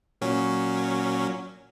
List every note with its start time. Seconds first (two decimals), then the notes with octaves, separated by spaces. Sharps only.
0.21 A#2 F#3 C#4